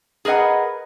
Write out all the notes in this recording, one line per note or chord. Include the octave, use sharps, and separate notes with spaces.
G#4 A#4 B4 D#5 F#5